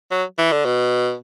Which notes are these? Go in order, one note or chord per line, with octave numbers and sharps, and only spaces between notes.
F#3
E3
D3
B2